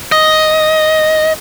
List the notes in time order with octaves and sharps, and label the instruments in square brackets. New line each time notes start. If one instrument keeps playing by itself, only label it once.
[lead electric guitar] D#5